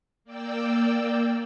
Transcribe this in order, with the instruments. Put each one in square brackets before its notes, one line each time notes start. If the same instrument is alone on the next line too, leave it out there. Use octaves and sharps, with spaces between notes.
[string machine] A#3 D5 G5 E6